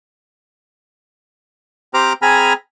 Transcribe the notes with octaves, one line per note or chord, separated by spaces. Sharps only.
C4 G4 C5 A#5 D6 F6
C4 G#4 G#5 A#5 B5 F6